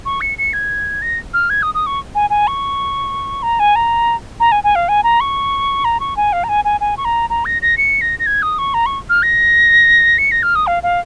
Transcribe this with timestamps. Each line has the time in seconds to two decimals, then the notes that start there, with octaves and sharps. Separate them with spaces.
0.05 C#6
0.21 C#7
0.38 C#7
0.53 G#6
1.02 A#6
1.34 F6
1.50 G#6
1.62 D#6
1.74 D#6
1.86 C#6
2.15 G#5
2.30 G#5
2.47 C#6
3.42 A#5
3.59 G#5
3.75 A#5
4.40 A#5
4.52 G#5
4.64 G#5
4.75 F5
4.88 G#5
5.03 A#5
5.20 C#6
5.84 A#5
6.00 C#6
6.17 G#5
6.33 F5
6.44 A#5
6.49 G#5
6.65 G#5
6.80 G#5
6.97 C#6
7.05 A#5
7.30 A#5
7.45 A#6
7.62 A#6
7.77 C#7
8.01 A#6
8.19 A#6
8.26 G#6
8.42 D#6
8.58 C#6
8.74 A#5
8.86 C#6
9.09 F6
9.22 A#6
10.18 C#7
10.31 A#6
10.43 F6
10.55 D#6
10.67 F5
10.83 F5